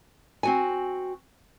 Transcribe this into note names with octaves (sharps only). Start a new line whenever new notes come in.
C4 F#4 G#5